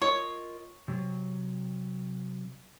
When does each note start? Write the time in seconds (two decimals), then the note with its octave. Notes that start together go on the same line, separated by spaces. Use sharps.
0.02 F4 A#4 C#5 D#5
0.88 C3 F#3